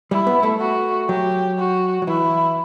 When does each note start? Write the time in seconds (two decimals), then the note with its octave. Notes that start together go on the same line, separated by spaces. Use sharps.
0.11 G3 E4
0.27 B3
0.43 A3
0.60 F#4
1.09 F#3 G4
1.58 F#4
2.02 F#3
2.07 E3 E4